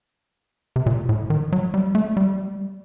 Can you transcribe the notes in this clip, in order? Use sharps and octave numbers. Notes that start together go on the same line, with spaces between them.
C3
A#2
A2
D#3
F#3
G3
A3
G3